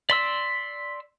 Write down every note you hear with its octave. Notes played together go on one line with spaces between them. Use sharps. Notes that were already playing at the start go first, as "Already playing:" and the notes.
D5 C6 E6 B6